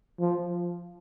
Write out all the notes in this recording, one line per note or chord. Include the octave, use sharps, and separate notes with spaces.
F3